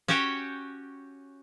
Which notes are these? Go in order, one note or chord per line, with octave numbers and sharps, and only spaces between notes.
C#4 F#4 G4 C#5 G5